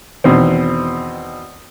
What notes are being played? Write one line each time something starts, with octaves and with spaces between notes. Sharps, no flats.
E2 B2 D#3 C4